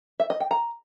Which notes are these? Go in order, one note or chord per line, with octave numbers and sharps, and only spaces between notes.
E5
D#5
G5
A#5